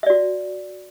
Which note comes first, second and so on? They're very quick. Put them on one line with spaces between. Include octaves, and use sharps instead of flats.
E5 D5 F#4